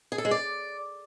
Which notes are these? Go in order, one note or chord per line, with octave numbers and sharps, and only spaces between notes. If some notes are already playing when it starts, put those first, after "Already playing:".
G#4
A4
G#3
D5